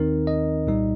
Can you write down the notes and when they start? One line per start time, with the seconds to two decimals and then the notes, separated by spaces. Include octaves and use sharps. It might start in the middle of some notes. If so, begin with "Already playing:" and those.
Already playing: D#2 D#3 C4 D#4 A#4
0.27 D#5
0.67 C2 A#2 G3 D#4